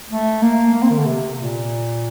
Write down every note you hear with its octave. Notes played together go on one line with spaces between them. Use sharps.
A3
A#3
A#3
C4
D#3
D3
C3
A#2